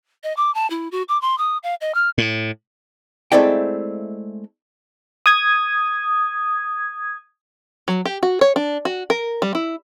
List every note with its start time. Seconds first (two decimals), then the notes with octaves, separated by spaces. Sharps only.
0.24 D#5
0.37 D6
0.55 A5
0.70 E4
0.92 F#4
1.08 D6
1.22 C6
1.38 D#6
1.63 F5
1.81 D#5
1.95 F6
2.18 A2
3.32 G#3 A3 C4 E4 D5 G5
5.26 D#6 G#6
7.88 F#3
8.05 G4
8.23 F#4
8.41 C#5
8.56 D4
8.85 F#4
9.10 A#4
9.42 G3
9.55 E4